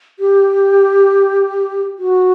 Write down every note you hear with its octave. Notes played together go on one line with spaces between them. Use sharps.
G4
F#4